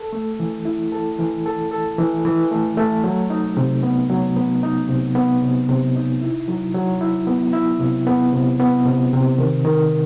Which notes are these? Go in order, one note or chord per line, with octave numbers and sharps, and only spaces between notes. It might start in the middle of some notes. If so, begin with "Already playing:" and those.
Already playing: A4
A3
E3
E4
A4
E3
A4
A4
E3
E3
A3
A3
F#3
D#4
C3
B3
F#3
B3
D#4
C3
B3
C3
C3
D#4
E4
F#3
F#3
E4
B3
E4
C3
B3
C3
B3
C3
C3
D#3
D#3